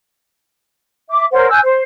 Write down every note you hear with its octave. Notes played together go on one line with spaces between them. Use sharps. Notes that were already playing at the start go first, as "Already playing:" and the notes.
E5 D6
A#4 C5 C#5 F#5
G#5 E6 F#6 G6
C5